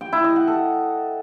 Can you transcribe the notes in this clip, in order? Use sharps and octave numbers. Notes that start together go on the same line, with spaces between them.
G5
E4
D#5
F#5
A4